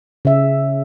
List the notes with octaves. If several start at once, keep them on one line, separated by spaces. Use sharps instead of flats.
C#3 E5